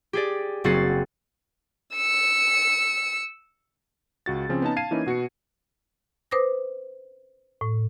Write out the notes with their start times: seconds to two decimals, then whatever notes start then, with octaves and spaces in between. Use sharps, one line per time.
0.13 G4 G#4 D5
0.64 F#1 C4 F#4 G#4 A6 C7
1.95 E6 C#7
4.26 C#2 F#4 A6
4.49 C#3 F3 C4 C#4
4.62 B3 C#4 D#4 A5
4.76 F5 A5 G#6 C7 D#7
4.91 E3 A#3 C#4 D#4 E4
5.06 B2 F#4 B4 C#7
6.31 B4 C5 D6 D#6 A#6
7.61 A2